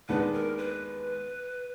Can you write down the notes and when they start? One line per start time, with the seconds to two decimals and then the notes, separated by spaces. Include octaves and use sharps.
0.09 D#2 D#3 G#3 B3 D4 B4
0.34 A#4
0.57 B4